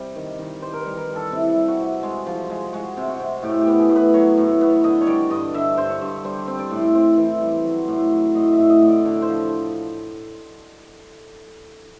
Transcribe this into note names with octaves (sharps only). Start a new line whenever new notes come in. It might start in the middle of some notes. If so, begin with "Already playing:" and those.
Already playing: C3 G3
D#3
D#3
G3 C5
A#4
B4
G3
A#4
G3
A4
C3 E4
G3
F#4
C3
G#3
F3
G#3
G#3 F#4
C3
F#4
C3
A2 G4
G4
B3
G#4
A2
B4
F#3 C#5
A2
C#5
B3
D3 D#5
C#5
G3 D5
G2 D#5
D3 E5
G2 C5
C#5
G2
G3 C5
C4
D5
A2
C4
E3
G3
F#3
A2
F#3
A2 D#5
E5
A2
D#5
A2
D5
D5
D3 C#5
C5
F3